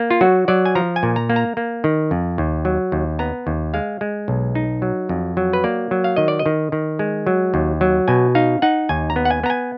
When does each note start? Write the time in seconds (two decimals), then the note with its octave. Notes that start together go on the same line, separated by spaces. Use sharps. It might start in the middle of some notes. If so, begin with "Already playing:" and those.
Already playing: A#3
0.11 F4
0.21 F#3 F#4
0.48 F#3 D5
0.66 G#5
0.75 F3 A#5
0.96 G#5
1.03 A#2
1.16 A#5
1.30 A#3
1.36 A#5
1.57 A#3
1.84 D#3
2.11 F2
2.38 D#2
2.65 F#3
2.92 D#2
3.19 B3 A#5
3.47 D#2
3.74 G#3 F5
4.01 G#3
4.28 B1
4.55 D#4
4.82 F#3
5.09 F2
5.37 F#3
5.53 B4
5.64 A#3 D5
5.91 F#3
6.04 F5
6.16 D#3 D#5
6.28 D5
6.39 D#5
6.46 D#3
6.72 D#3
6.99 G#3
7.27 F#3
7.54 D#2
7.81 F#3
8.08 B2 G#5
8.35 D#4 F5
8.62 D#4 F#5
8.89 D#2 G#5
9.10 A#5
9.16 B3
9.25 F#5
9.30 G#5
9.44 B3 A#5
9.50 G#5